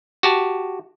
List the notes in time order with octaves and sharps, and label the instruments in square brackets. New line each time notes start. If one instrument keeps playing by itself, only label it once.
[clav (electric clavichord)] F#4 G4 A5